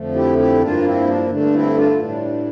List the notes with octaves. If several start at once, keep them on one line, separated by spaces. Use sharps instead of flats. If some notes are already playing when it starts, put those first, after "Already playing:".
Already playing: F2 D3 F3 A3
E4 G4
E4 G4
G2 F3 A#3 D4 F4
C4 E4
D4
G2 D3 A3 D4
C4 E4
D4 F4
A2 E3 G3 D4